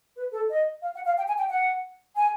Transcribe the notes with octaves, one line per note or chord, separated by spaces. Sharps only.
B4
A4
D#5
F5
F#5
F5
G5
G#5
G5
F#5
G#5